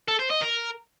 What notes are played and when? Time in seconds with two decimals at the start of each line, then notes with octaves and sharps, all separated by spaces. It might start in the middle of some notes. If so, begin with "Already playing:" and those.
0.08 A4
0.19 C5
0.30 D#5
0.41 A#4